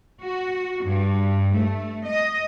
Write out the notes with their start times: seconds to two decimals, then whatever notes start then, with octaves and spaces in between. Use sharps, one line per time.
0.22 F#4
0.83 G2
1.55 A3
2.06 D#5